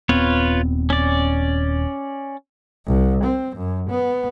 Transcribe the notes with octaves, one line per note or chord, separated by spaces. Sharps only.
D#1 B3 C4 F4 B4 C#5
C#4 D5
C2
C4
F#2
B3